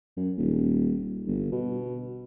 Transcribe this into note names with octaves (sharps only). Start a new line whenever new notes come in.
F#2
D#1
G1
B2